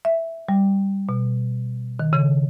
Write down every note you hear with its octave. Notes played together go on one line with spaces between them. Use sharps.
E5
G3
B2
D#3
C#3